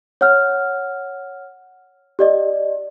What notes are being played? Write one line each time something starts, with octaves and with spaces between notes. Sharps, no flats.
C#5 F#5 F6
G4 D5 D#5